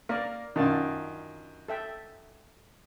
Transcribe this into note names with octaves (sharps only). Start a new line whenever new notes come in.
A#3 A#4 D5
F#2 D#3 D4 F4 A5
A4 E5 G5